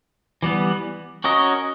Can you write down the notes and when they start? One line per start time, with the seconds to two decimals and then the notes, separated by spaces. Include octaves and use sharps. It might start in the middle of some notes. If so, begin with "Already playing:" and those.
0.43 E3 G3 B3
1.24 C#4 F#4 A#4 D#5